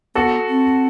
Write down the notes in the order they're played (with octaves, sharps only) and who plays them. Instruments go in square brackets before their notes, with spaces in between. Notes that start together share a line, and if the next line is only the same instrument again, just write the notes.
[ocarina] B3 [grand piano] F#4 A4
[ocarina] C4